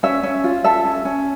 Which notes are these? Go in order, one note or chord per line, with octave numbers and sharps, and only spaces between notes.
C#4 E5
C#4
F4
A4 E5
C#4
C#4